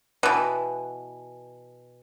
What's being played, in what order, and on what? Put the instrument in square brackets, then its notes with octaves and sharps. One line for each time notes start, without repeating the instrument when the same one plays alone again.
[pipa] B2 E3